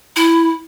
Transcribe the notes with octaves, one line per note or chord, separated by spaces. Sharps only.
E4